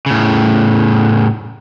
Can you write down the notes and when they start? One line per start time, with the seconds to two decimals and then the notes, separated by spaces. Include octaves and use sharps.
0.06 A2 C#3